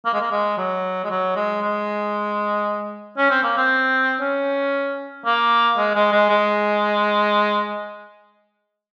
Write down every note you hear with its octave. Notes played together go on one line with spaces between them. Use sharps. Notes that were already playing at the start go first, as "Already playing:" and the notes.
A#3
G#3
A#3
G#3
F#3
G#3
F#3
G#3
G#3
C#4
C4
A#3
C4
C#4
A#3
G#3
G#3
G#3
G#3